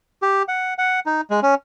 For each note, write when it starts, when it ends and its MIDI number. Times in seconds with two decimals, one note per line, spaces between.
0.22 0.43 67
0.48 0.74 78
0.78 1.00 78
1.06 1.21 63
1.30 1.40 56
1.43 1.55 61